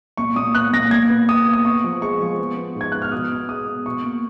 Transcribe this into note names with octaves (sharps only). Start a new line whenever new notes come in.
A#2 C#6
A#2 D#6
B3 F#6
A#2 A#6
A#2 G#6
B3
B3 D#6
B3
D#6
B3 C#6
F3
G#3 C#6
F3
B3
B3
G#2
G#6
B3 F#6
F6
B2 D#6
B3
G#3 D#6
B3
B2 C#6
A#3